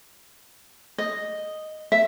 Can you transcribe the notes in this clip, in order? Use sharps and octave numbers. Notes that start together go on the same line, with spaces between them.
D#5
E5